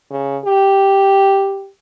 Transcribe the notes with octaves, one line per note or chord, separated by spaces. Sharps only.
C#3
G4